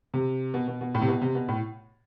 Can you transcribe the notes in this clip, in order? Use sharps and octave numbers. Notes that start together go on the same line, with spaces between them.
C3
B2
B2
B2
A2
C3
B2
C3
B2
A2